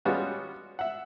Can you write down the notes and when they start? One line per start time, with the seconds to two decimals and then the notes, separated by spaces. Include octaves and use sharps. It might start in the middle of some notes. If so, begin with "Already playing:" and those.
0.05 G3 G#3 B3 C#4 F4 F#4
0.79 E5 F#5